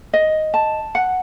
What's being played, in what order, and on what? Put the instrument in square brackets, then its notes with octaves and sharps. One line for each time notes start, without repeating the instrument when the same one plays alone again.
[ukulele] D#5
A5
F#5